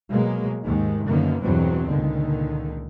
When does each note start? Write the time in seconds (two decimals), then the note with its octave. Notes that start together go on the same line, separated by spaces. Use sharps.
0.11 B2 F#3 G#3 A#3
0.65 D#2 G#2 D#3 G#3
1.06 F#2 D3 D#3 A#3 B3
1.42 E2 G2 B2 E3 F#3 C4
1.88 C#2 A#2 D3 D#3